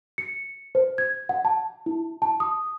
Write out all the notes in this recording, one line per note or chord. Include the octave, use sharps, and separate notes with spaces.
C#7
C5
G#6
F#5
A5
E4
A5
D#6